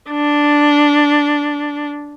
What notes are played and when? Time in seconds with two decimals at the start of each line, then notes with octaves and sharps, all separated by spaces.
0.10 D4